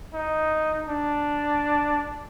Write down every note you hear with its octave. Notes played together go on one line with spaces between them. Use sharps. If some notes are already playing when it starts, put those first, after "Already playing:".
D#4
D4